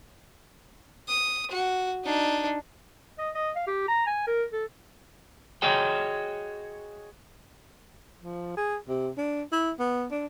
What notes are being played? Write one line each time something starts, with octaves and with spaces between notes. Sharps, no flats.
D#6
F#4
D4 D#4
D#5
D#5
F5
G4
A#5
G#5
A#4
A4
F#4 G#4 C#5 D#5 G5
F3
G#4
C3
D4
E4
B3
D4